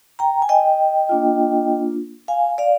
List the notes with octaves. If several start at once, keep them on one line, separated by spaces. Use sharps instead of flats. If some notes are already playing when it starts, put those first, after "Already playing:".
G5 A#5
G#5
D#5 G5
A#3 D4 F4
F5 G#5
D5 F5